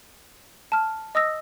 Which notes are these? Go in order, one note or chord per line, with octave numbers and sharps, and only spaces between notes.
A5 F6
D#5 D#6 E6 A#6